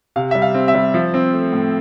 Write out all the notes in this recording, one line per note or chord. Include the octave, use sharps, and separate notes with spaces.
C3 F5
G3 E5
F5
C4
E5
G3
F3
C4
A3
A2